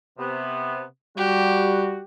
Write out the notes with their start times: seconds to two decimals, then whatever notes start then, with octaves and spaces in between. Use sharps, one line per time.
0.19 C3 B3
1.17 G3 F#4 G4